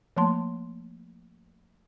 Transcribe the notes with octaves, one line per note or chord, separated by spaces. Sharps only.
F3 A3 A#3 A5 C6